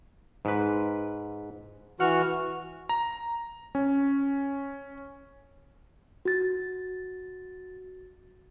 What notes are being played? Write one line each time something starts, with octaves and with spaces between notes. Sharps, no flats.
G#2 B4
E3 F#4 F#5 F6
A#5
C#4
F#4 A6